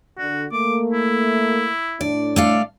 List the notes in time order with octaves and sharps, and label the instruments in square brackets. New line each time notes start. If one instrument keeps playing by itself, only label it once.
[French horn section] D3 [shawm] F#4
[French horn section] A3 A#3 [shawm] D6
[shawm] E4
[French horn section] A2 D4 [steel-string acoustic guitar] D5
[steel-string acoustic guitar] A3 A4 F5 [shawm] D5